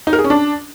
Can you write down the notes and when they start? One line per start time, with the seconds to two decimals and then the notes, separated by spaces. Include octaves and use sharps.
0.07 D#4
0.13 A#4
0.19 G#4
0.24 C#4
0.30 D4